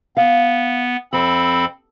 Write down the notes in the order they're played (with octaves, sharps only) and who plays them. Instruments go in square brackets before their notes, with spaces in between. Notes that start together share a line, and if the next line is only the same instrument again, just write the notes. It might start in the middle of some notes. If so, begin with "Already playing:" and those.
[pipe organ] B3 [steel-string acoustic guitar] F5
[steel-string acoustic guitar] F2 [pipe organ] C4 A4 B5